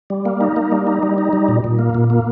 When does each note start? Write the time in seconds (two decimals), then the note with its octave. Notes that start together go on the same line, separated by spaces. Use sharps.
0.10 G3
0.25 A#3
0.41 D#4
0.56 A#3
0.72 G3
0.87 D#4
1.03 G3
1.18 D#4
1.33 G3
1.48 A#2
1.64 A#2
1.79 A#3
1.95 A#2
2.10 A#3